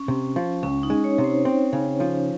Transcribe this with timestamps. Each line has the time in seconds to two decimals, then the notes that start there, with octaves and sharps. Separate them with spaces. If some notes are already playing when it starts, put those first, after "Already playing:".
Already playing: C#4
0.08 C3
0.36 F3
0.63 C#2 C#4
0.83 D#4
0.90 G#3
1.04 C#5
1.18 C3
1.24 C5
1.45 C4
1.73 C#3
2.00 F3